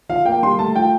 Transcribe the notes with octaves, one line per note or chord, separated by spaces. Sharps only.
F3 F5
A#3 G5
G3 C6
A3 A5
F3 G5